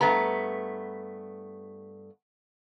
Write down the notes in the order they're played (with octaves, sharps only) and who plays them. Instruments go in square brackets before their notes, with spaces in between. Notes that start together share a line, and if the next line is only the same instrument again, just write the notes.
[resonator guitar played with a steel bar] G2 A3 B3 A#5